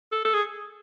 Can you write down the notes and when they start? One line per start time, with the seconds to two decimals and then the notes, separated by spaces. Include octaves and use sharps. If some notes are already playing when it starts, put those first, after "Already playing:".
0.12 A4
0.25 A4
0.34 G#4